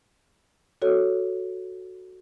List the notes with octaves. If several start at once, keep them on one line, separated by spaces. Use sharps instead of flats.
F#4 A4 C#5